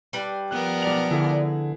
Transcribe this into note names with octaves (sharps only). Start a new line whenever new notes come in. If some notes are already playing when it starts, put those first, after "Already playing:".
G3 D4 B4
F3 B3 A#4 F#6
B1 D5 F7
D3 E4 G#4